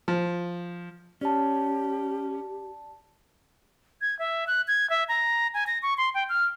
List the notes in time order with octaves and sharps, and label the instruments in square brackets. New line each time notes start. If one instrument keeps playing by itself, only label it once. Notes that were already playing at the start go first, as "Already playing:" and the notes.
[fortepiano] F3
[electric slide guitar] C#4 [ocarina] G4 [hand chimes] D5 A5
[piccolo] G#6
E5
F#6
G#6
E5
A#5
G#5
A#6
C#6
C6
G5
F6